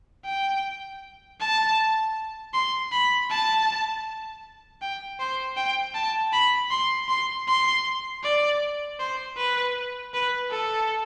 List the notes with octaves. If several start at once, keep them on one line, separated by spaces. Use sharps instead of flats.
G5
A5
C6
B5
A5
G5
C5
G5
A5
B5
C6
C6
C6
D5
C5
B4
B4
A4